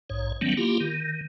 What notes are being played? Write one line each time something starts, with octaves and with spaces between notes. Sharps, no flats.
A#1 G#2 C#5
D#3 F#3 G3 A3 B3 C#4
A#3 E4 F4 G4
D#3